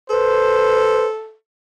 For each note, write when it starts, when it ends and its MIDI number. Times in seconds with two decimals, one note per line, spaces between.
0.10 1.34 69
0.10 1.06 71
0.10 1.10 72